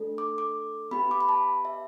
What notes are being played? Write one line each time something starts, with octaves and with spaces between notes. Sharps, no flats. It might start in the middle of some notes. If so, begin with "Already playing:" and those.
Already playing: A3 D4 A4
D6
D6
B3 G4 B5
D6
B5
A5
E5